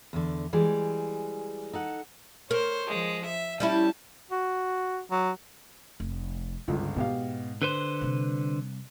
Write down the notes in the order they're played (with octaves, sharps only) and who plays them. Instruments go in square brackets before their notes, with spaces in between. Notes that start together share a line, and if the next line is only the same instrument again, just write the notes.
[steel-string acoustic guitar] E2 D3
E3 G3 G#3 G#4
D#4 A4 F#5
[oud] A#4 [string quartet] C5 C#5
[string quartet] F3 G#3
E5
[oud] G3 C#4 E4 [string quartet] A5
[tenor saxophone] F#4
F#3
[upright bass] F1
[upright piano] G1 C#2 [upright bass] G2
[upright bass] G#2 [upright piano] B2 G4 F5
[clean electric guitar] D3 B4 C5 [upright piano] F#6
[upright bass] C3 G3